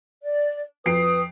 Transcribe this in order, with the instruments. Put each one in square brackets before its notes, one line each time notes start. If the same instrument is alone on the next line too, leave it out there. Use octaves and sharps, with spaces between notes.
[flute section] D5
[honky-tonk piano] F2 C7 D7 [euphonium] B4 [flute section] D#6